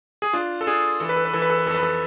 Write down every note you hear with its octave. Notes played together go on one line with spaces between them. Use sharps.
G#4
D4 F4
A4
D4 G#4
E3 A4
B4
A4
B4
E3 A4
B4
A4
B4
F2 A4
B4
A4